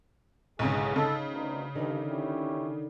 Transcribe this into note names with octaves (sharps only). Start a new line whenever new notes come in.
B1 G#2 C#3 E3 G#4
C#3 D#4 A4
D2 B2 D#3
G2 D3 D#3
C#4 E4 G4